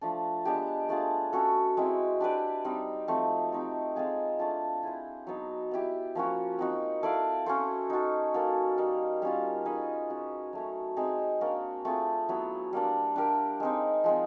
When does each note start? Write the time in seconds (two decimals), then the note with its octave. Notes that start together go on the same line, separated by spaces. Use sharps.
0.01 F3 A3 D4
0.45 G#3 B3 D4 G4
0.89 A3 D4 F4 G#4
1.33 C#4 F#4 A4
1.77 G#3 C4 E4
2.20 D4 G4 B4 D5
2.65 G3 C4 D#4
3.08 F3 A3 C4
3.52 A3 C4 D#4 G4
3.96 G#3 C4 F4 G#4
4.39 A3 D4 F4
4.83 E4 G#4 C5
5.27 F#3 B3 D#4
5.71 B3 E4 G4
6.15 F3 A#3 C#4 F#4
6.59 C4 D#4 F#4
7.03 E4 A4 D5 F5
7.46 C#4 F#4 A4 C5
7.90 D#4 F#4 A4
8.34 A#3 D#4 F#4 A4
8.78 G3 A#3 D#4
9.22 G3 A#3 C#4 F4
9.65 D#4 G#4 B4 D#5
10.10 G#3 C#4 F#4
10.53 F#3 A3 C#4
10.97 G#3 C4 D#4 G#4
11.41 A#3 D4 F#4 A#4
11.85 A3 C4 F4 G#4
12.29 F#3 B3 E4
12.73 G3 A#3 D4
13.16 D4 G4 A#4
13.60 G#3 C4 D#4
14.04 F3 G#3 C4